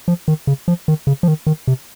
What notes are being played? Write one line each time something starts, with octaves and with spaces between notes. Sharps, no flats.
F3
D#3
C#3
F3
D#3
C#3
F3
D#3
D#3
C3